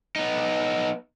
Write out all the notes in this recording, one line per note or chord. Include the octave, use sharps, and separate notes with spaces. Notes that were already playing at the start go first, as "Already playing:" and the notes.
B3 D#4